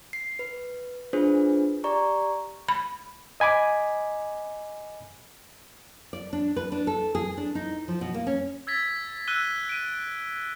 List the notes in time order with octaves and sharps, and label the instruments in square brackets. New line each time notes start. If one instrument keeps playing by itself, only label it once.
[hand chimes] C7
B4
D4 F4 G#4 B4 C5
G4 D5 A#5 C#6
[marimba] B5
[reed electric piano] D#5 G#5 B5 D6
[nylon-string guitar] D5
D4
B4
D4
A4
G#4
D4
D#4
F3
B2
A#3
C#4
[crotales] E6 G#6 A6 B6
E6 F#6 D#7 G7
D7 D#7